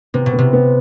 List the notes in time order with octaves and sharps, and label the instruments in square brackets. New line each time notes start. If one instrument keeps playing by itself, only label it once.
[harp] C3 [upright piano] B3
[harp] B2
[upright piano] B3
[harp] C3
[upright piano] B3